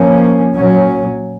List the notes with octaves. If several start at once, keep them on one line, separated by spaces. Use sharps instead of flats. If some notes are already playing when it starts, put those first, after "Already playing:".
Already playing: F3 A#3 C#4
A#2 F#3 C#4